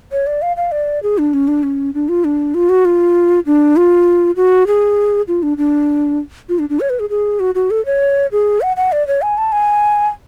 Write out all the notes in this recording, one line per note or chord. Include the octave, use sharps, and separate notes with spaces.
C#5
D5
F5
F5
D5
G#4
D4
C#4
D4
C#4
D4
F4
D4
F4
F#4
F4
D4
F4
F#4
G#4
F4
D4
D4
F4
D4
D4
C#5
B4
G#4
G#4
F#4
F#4
A4
C#5
G#4
F#5
F#5
D5
C#5
G#5
A5
G#5